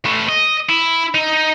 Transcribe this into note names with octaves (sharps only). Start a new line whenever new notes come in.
A3 B4
D#5
E4
D#4